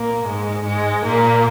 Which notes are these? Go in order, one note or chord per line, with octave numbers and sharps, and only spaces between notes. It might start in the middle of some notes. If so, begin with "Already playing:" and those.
Already playing: A#2 A#3
G#2 G#3
G#2 G#3
A#2 A#3